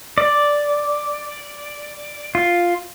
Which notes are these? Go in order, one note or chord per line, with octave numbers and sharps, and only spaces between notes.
D5
F4